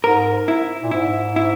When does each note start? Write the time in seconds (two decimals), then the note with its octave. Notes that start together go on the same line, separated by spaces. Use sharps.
0.04 G#2 A#4
0.48 E4
0.83 A#2
0.91 G#2 E4
1.36 E4